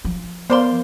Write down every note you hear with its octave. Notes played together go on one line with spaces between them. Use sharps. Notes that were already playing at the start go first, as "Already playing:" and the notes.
F3
B3 A#4 C5 D5 F5 C6